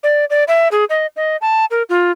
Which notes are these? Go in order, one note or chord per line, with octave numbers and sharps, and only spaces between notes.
D5
D5
E5
G#4
D#5
D#5
A5
A#4
F4